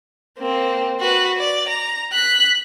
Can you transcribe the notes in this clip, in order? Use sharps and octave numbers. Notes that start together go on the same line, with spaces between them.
A#3 C4
F#4 B4
D5
A#5
F#6 B6